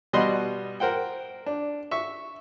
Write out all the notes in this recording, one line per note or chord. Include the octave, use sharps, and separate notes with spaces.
B2 G3 F#4 D#5 B5 C6
A#4 C5 F#5 G5
D4
E5 C#6